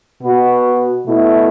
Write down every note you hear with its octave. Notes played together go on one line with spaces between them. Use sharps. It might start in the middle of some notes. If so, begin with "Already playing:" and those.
B2 B3 F#4
B2 A3 E4